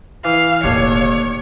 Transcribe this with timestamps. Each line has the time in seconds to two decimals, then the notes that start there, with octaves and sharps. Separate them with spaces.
0.25 E3 F5
0.64 E1 D#2 A2 D3 C#5